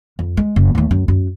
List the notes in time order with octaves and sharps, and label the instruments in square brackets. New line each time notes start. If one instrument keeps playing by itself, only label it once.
[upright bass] F2
G#3
F#1
D#2 A3
F#2
F#2